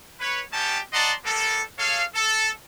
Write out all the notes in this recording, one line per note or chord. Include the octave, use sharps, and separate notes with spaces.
B4 C#5
B3 C#4 D#4 G4 G5 A5
D5 D#5 F#5 A5 A#5 C6
G3 A#3 B3 A4
G#4 A4 C#5 F5
A4